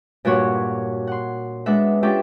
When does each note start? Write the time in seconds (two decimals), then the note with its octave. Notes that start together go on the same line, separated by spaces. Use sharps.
0.25 G2 A#2 F#4 C#5 F#5
1.07 F#5 C6
1.66 G#3 B3 D4 E5 F#5
2.03 C#4 D4 F4 G4 A4 E5